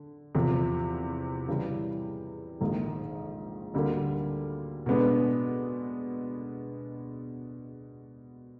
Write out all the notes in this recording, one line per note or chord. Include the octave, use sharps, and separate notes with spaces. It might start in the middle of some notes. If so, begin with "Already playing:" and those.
Already playing: D3
E2 C3 F3
C#3 E3 G3
A#1 G#2 D#3
D2 D3 G3 A#3
B2 G#3 B3 D4